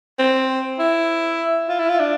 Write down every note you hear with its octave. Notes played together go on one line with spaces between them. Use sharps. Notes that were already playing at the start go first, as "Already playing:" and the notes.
C4
E4
F4
E4
F4
D4